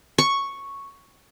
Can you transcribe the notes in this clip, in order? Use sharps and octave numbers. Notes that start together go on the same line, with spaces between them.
C#6